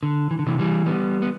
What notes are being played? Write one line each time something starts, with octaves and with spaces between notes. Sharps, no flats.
D3
E3
D3
C3 E3
E3 G3
G3 B3
B3